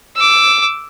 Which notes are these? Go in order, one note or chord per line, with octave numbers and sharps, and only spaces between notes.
D6 E6